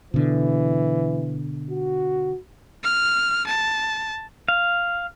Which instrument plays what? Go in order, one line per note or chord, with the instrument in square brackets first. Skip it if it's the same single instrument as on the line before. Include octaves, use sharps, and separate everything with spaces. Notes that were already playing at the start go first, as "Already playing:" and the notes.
[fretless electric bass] B2 D3 [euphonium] E3
[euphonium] F#4
[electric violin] F6
A5
[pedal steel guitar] F5